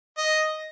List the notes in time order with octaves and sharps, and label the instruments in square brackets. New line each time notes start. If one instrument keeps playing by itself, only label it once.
[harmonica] D#5